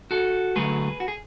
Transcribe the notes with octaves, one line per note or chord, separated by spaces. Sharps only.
F#4 A4
D3 F#3 A3 G#4 B4
F#4
G#4